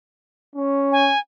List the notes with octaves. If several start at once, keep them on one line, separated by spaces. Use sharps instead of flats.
C#4
G#5